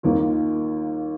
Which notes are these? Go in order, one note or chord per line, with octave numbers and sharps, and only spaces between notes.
D#2 D#3 A#3 F4